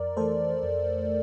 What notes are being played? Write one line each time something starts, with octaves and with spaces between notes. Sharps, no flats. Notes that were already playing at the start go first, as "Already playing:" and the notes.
Already playing: F2 A#4 D5
E3 A3 A4 C5
F2